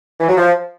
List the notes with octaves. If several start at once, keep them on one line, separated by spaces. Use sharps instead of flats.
E3
F#3
F3